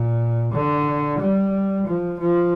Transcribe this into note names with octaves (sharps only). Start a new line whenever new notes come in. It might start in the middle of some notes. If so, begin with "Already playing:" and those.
Already playing: A#2
D3
G3
F3
F3